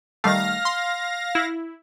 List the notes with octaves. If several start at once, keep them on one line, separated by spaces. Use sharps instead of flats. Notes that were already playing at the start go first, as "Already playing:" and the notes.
D#3 G3 A3 F5 A#6
C6
E4